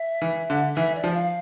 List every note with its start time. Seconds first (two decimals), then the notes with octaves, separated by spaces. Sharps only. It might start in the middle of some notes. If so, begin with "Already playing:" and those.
Already playing: E5
0.22 E3
0.50 D3
0.76 E3 E5
0.95 D5
1.04 F3
1.13 F5